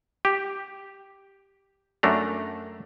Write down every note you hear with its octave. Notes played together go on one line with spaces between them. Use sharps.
G4
F#2 A3 D4 A#5